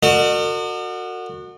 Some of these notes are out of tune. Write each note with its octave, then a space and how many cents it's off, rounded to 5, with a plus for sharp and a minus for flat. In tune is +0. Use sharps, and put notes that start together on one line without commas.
F#4 -15 A#4 -45 D#5 -45